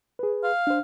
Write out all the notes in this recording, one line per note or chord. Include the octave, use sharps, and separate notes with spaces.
G#4 B4
F5
D4 C5